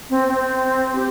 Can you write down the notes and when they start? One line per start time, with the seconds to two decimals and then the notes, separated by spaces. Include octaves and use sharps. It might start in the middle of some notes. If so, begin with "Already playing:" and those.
0.10 C4
0.28 C4
0.95 G4